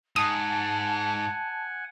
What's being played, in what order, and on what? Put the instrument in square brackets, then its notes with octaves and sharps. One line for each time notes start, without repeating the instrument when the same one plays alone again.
[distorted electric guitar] G#2 [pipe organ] F#5 G#5 [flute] A5 [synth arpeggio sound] D#6